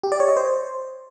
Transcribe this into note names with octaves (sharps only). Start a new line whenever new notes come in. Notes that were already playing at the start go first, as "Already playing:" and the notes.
G4
D5
C#5
D#5
C5